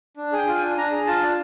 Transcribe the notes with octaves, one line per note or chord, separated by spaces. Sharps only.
D4
G#4
G5
F4
D4 G#5
D4 A#5
G#4
F4 A5
D4